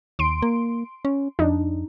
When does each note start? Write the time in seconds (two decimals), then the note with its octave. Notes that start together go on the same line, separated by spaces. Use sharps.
0.19 D#2 C6 D7
0.42 A#3
1.05 C#4
1.39 F2 D4 D#4